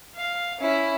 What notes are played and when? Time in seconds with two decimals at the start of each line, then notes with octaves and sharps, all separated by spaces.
0.15 F5
0.60 C#4 E4